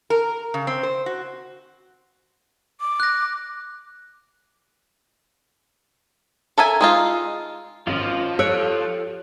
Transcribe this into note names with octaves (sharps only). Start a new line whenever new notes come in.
A#4
C#3
C4
C5
F#4
D6
F#6 A#6
A4 A#4 E5 G#5
G#3 D#4 F4
G#1 F3 C#4 F4 D#5 F6
G4 A4 C#5 E6 F#6 D7